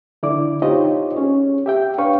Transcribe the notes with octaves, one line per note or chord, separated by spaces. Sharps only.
D3 E4 D5 D6
D#4 F4 G4 C5 C#5 D#5
C#4 G#4 C#5
G4 E5 G5
D4 B4 C#5 F5 G5 C#6